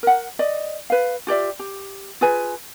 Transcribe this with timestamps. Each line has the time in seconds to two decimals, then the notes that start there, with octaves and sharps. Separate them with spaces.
0.03 A#4 F#5
0.39 D5 D#5
0.90 B4 F5
1.27 F4 G4 D5 E5
1.59 G4
2.21 F4 G#4 B4 G#5